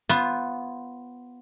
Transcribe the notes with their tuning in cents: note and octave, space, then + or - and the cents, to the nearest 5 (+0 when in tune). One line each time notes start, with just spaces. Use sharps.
B3 +0 F4 -5 C5 +35